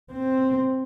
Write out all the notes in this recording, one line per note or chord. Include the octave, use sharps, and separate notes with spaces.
C4